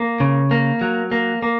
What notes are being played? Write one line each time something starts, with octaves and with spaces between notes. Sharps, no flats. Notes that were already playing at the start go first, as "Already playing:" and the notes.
Already playing: A#3
C#3
A#3
F#3
A#3
A#3